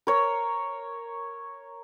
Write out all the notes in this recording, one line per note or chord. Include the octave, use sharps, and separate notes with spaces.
A#4 C#5